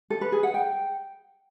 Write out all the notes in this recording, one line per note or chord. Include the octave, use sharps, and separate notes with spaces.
A4
B4
G#4
F#5
G5